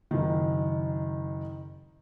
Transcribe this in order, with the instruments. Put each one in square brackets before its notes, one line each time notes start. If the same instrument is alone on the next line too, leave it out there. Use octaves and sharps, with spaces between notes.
[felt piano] F#1 D#3